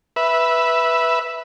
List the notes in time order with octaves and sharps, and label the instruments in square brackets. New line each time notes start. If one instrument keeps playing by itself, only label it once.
[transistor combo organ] B4 E5